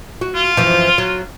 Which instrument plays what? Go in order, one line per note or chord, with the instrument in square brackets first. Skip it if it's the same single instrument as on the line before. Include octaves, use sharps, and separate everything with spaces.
[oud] F#4
[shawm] F4
[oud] F#2 E3 F3
F#3